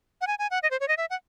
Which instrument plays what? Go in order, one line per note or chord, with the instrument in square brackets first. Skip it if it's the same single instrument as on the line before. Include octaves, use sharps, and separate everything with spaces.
[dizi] F#5
G#5
G#5
F#5
D#5
C5
C#5
D#5
E5
F#5